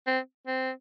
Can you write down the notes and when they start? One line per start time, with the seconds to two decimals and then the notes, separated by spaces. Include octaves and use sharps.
0.07 C4
0.47 C4